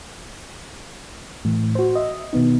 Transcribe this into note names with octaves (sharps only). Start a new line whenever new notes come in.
A2 E3
F#4 C5
D#5 E5
B2 D#3 B3 D#4